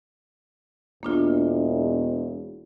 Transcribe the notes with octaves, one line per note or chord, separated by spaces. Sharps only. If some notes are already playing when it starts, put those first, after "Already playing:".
E1 A#3 D4 F4